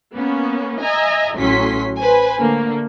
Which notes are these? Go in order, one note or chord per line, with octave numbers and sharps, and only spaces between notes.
A#3 B3 C#4
D#5 E5 G#5 A#5
A1 A2 F#3 C#4 C6 B6
B4 C5 G#5
D3 A3 A#3